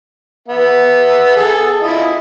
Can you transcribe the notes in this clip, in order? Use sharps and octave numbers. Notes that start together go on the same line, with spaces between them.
B3 E5
G#4 A4
E4 F4 D#5